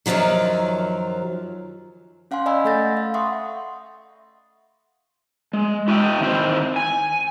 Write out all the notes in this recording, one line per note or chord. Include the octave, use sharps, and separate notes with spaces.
F#2 B2 D#3 F3 F#3
C#4 F5 F#5 G#5 C6
D5 D#5 F#5 G#5 B5 E6
A3 A4 B5 G6 A6 A#6
F5
E5 F#5 C6 C#6 D#6
G#3
E4 F#4 D#5 E5 G5
D#3 C4 E4 C5
G#5